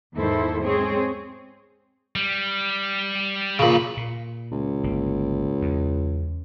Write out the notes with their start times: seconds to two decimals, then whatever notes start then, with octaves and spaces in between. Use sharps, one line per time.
0.16 E2 G#2 D#3 E4 A4 C5
0.63 G#3 C4 G#4 C#5
2.16 G3
3.59 B1 A#2 C#3 B5
3.97 A#2
4.52 C#2
4.83 G1 A#3
5.62 E2